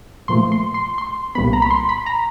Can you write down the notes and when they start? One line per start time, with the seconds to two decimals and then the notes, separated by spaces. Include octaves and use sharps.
0.28 A#2 F3 A3 C6
0.52 C6
0.74 C6
0.98 C6
1.35 C2 A#2 G3 B3 B5
1.53 A#5
1.62 B5
1.71 C6
1.89 B5
2.06 A#5